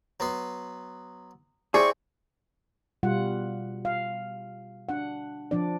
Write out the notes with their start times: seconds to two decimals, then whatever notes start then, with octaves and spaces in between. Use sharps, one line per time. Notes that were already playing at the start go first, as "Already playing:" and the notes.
0.20 F#3 B3 C6
1.74 C4 E4 G#4 D5 C#6
3.03 B2 G3 F4 F#5
3.85 F5
4.89 D4 F#5
5.51 F3 D4 D5